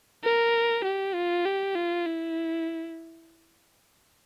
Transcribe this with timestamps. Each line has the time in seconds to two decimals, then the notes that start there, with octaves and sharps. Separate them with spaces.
0.24 A#4
0.84 G4
1.14 F4
1.45 G4
1.75 F4
2.06 E4